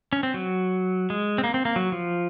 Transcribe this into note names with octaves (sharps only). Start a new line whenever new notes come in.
C#4
C4
F#3
G#3
C4
A#3
C4
A#3
F#3
F3